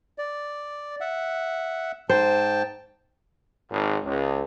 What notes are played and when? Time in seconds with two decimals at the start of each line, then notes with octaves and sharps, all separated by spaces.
0.18 D5
1.00 E5 F#5
2.09 G#2 C5 G5 A5
3.71 G#1
4.04 C#2